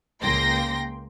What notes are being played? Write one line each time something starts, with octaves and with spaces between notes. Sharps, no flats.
C#2 A#3 G5 C6 A#6